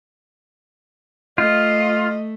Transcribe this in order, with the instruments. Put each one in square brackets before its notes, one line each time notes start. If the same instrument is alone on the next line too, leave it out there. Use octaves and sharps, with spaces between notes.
[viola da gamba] A3 [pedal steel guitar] F4 [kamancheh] D#5